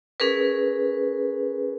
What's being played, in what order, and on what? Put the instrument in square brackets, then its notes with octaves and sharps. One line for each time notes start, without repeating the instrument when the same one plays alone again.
[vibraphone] C#4 G#4 A#4 B4